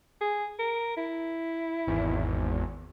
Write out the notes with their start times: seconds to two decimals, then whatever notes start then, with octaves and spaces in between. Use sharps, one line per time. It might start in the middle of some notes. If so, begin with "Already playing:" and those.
0.21 G#4
0.59 A#4
0.97 E4
1.87 G#1 E2